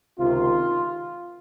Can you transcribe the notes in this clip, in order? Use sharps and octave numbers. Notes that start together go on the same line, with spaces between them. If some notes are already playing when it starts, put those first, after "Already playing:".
C#2 C3 D#3 F4